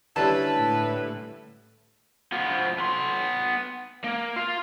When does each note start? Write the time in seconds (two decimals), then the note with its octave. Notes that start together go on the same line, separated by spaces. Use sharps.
0.16 D3 G3 C#4 E4 B4 A5
0.57 A2
2.32 F3 B3
2.78 B3 C6
4.04 A#3
4.36 F4 F5